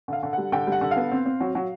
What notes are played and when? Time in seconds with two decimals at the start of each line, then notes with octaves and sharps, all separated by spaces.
0.08 D3 F5
0.23 D3
0.33 G3 F#5
0.52 D3 G5
0.67 G3
0.72 F#5
0.81 D3
0.91 F5
0.96 B3
1.12 C4
1.26 C4
1.40 F#3
1.55 F#3